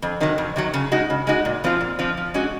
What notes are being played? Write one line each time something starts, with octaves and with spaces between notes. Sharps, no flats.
F2
C3 D#3 F#3
F2
C3 D#3 F#3
C#3
G#3 D#4 F#4
C#3
G#3 D#4 F#4
A#2
F3 C4 F4
A#2
F3 C4 F4
F3
G#3 C#4 F#4